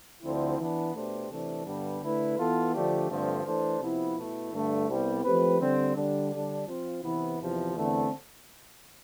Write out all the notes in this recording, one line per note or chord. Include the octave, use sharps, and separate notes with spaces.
D2 D3 F3 C4 E4
E3 B3 D4
B2 A3 D4 G4 C5
C3 E3 A3 D4 A4
G2 D3 G3 B3 D4
D3 A3 E4 B4
E3 B3 F4 A4
D3 F3 A3 D4 G4
G2 D3 F3 A3 C4
E3 A3 D4 A4 C5
C3 F3 B3 E4
B2 A3 E4
G2 D3 A3 D4
C2 C3 G3 B3
F3 A3 C4 G4 B4
D3 G3 C4
D3 G3 D4
D3 G3 D4
F3 C4 F4
C3 E3 B3 E4
E2 C3 F3
E2 D3 A3 C4